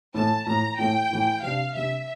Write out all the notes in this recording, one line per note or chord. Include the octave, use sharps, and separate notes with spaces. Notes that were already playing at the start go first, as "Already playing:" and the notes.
A2 E3 A3 A5
A2 E3 A3 A#5
A2 E3 A3 G5
A2 E3 A3
C3 G3 D4 F5
C3 G3 D4 E5